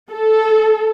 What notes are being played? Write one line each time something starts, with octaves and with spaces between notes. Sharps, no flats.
A4